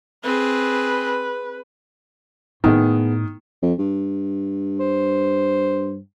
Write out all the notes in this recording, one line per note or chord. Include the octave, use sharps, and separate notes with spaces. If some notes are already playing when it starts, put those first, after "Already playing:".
C4 G#4 B4
A2 D#3 B3 G#4
F2
G2
C5